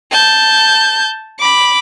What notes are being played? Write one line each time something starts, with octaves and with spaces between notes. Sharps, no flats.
A5 G6
B5 D6